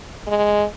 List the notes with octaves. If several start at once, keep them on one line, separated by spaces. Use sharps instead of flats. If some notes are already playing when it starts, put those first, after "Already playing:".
G#3